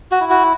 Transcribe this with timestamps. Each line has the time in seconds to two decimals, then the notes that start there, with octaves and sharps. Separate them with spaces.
0.12 F#4
0.21 E4
0.30 F#4